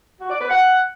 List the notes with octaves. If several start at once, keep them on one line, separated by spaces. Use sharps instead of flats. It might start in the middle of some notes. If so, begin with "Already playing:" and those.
F#4
D5
B4
F#5